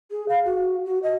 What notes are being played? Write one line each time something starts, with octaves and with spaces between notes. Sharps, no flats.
G#4
F5
F#4
F#4
D#5